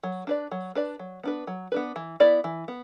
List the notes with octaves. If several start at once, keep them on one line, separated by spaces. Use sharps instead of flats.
F#3
D4 B4 D5
F#3
D4 B4 D5
F#3
B3 D4 B4
F#3
B3 D4 B4
E3
B3 E4 D5
E3
B3